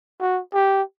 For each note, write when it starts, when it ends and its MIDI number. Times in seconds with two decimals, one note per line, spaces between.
0.21 0.40 66
0.53 0.82 67